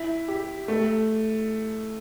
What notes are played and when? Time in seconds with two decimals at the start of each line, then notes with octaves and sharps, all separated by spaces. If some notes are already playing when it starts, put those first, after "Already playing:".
Already playing: E4
0.28 G4
0.68 A3